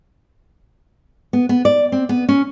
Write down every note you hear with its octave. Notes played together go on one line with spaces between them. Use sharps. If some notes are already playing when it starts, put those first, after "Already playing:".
B3
B3
D5
C4
B3
C#4